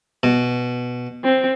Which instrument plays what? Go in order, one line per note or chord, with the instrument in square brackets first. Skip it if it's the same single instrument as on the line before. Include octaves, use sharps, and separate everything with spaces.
[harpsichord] B2
[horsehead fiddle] C4